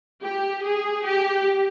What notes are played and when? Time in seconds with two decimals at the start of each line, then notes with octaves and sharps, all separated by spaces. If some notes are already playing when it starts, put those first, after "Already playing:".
0.23 G4
0.64 G#4
1.06 G4